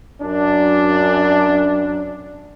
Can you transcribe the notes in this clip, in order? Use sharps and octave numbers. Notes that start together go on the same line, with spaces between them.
F#2 D4